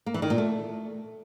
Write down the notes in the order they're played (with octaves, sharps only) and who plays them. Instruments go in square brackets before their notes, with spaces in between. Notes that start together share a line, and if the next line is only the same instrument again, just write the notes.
[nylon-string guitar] A#3
E3
D#3
A#2
A3